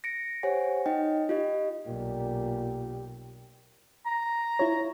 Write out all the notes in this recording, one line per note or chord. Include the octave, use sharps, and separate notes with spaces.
A#6 C#7 D7
G4 C5 C#5 F#5 G#5
D#4 D#5 G5
F4 G4 D#5
B1 A#2 G4
A#5
E4 F4 C#5